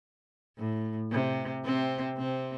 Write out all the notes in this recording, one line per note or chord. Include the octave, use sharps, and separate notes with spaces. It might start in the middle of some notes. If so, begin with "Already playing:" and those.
A2
C3
C3 C4
C3 C4